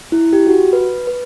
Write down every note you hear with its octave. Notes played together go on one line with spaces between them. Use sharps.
E4
G4
F#4
B4
B4